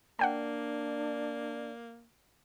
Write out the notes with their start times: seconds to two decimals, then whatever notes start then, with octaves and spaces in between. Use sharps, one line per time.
0.19 A#3 D4 D5 F#5 G5 A5